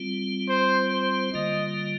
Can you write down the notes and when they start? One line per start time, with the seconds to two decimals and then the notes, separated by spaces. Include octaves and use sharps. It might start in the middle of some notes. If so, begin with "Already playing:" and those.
Already playing: G3 C4 F4
0.48 C5
0.91 C5
1.34 D3 G3 A#3 F4 D#5